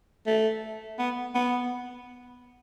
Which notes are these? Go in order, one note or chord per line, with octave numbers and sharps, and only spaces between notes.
A3
B3
B3